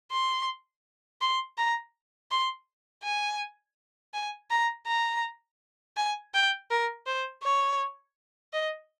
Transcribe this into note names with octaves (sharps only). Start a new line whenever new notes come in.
C6
C6
A#5
C6
G#5
G#5
A#5
A#5
G#5
G5
A#4
C5
C#5
D#5